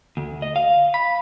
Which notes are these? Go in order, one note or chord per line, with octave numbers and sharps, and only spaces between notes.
D2
D#5
F5
B5